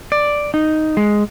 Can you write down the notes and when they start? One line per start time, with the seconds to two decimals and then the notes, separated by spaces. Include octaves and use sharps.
0.12 D5
0.54 D#4
0.97 G#3